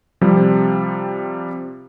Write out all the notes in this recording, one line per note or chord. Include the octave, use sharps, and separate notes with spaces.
C3 F3 G3